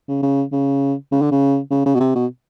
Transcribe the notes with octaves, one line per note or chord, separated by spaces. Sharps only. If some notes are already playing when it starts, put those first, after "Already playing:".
C#3
C#3
C#3
C#3
D3
C#3
C#3
C#3
B2
C3
B2